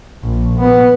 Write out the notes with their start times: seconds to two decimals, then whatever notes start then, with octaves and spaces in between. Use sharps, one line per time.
0.24 A#1
0.58 B3